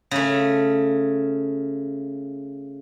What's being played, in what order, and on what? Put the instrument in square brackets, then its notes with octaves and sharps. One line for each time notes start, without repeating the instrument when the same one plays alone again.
[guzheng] C#3 A3